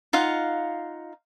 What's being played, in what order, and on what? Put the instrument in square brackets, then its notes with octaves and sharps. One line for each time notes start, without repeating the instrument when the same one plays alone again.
[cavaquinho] D#4 F4 F5 F#5